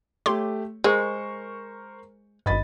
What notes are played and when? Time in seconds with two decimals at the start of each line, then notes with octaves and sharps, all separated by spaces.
0.26 A3 G4 C#5 C6 D6
0.84 G#3 A#4 C5 C#6
2.46 G#1 G2 D#5 B5 A6